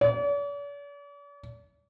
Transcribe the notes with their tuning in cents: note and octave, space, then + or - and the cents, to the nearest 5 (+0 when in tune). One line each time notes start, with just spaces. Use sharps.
D5 -45